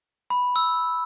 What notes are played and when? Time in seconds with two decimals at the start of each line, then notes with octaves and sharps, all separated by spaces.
0.30 B5
0.56 E6